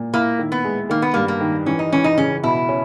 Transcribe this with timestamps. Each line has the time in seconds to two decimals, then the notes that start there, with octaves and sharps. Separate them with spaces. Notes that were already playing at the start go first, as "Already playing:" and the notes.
Already playing: A#2
0.14 A#3 E4
0.39 D#3
0.52 B3
0.64 G#3
0.89 D#3 A#3
1.02 B3
1.14 G2 A#3
1.28 A#3
1.41 D#3
1.66 E3 C#4
1.79 D#4
1.92 E3 C#4
2.04 D#4
2.18 C#3 C#4
2.43 B2 E4
2.69 C#4